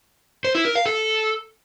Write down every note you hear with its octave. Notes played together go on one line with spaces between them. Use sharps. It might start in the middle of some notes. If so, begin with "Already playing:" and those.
C5
E4
A#4
F5
A4